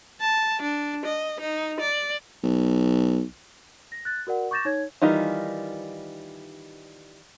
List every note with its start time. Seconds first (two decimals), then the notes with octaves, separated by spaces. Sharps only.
0.21 A5
0.62 D4
1.06 D#5
1.40 D#4
1.80 D5
2.44 B1
3.92 A#6
4.05 F#6 A6
4.27 F#4 A#4 D5 F#5
4.51 C#6 D6 G6 A6 A#6 E7
4.65 D#4 C#5 G#6
5.02 D#3 E3 G3 D#4 F4